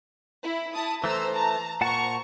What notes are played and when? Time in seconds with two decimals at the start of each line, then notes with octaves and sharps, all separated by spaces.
0.42 E4
0.73 E4 A5 D#6
1.04 E3 A3 C5 A#5 E6
1.35 A5 A#5
1.81 A#2 C5 F#5 A5 A#5 C#6